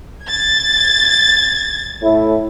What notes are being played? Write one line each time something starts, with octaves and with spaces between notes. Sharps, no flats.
G#6 A6
A2 E4